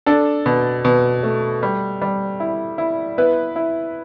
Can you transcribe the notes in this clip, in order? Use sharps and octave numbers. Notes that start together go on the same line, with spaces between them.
D4 A4
B2
B2
A3
G3
G3
E4
E4
B3 E4 B4
E4